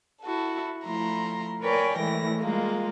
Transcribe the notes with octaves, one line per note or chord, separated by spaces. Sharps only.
E4 F#4 A4
F3 A3 E4 A#5 C6
A#4 B4 C#5 D5 G5 G#5
A2 E3 G#3 A3 A#6
G3 G#3 A#3 F4